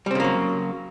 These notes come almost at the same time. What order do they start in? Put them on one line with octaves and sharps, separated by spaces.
G3 C4 C#3 A#3 F#3